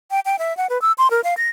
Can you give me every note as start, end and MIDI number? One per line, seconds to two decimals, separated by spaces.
0.11 0.20 79
0.25 0.39 79
0.39 0.56 76
0.57 0.67 78
0.70 0.80 71
0.82 0.92 88
0.98 1.10 84
1.10 1.21 70
1.24 1.34 77
1.37 1.50 94